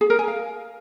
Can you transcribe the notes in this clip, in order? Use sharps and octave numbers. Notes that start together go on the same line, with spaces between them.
G#4
A#4
G#5
F5